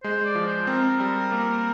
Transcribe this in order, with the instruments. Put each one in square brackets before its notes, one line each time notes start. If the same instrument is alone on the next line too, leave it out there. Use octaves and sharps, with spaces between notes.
[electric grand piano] G#3 [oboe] C5
[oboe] D5
[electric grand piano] F3
[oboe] C5
[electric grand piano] C4 [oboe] A#4
[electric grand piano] G3
A#3